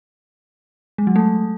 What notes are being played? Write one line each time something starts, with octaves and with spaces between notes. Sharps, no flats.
G#3
F#3
A3